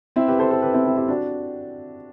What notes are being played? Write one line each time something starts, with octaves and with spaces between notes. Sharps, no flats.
C4 E4
G4 B4
A4 C5
A4 C5
G4 B4
C4 E4
C4 E4
E4 G4
D4 F#4